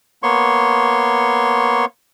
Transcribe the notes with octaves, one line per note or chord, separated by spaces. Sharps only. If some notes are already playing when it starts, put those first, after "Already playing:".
A#3 B3 C#5 C6 C#6